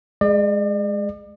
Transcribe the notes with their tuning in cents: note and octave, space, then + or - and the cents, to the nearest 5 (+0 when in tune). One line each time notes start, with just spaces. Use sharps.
G#3 +0 D5 +40